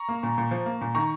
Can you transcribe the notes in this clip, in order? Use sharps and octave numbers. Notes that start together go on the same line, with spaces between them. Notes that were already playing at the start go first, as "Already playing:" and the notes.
Already playing: A#5 C#6
A#3
A#2
A#2
F3
A#3
A#2
D#3 A#5 C#6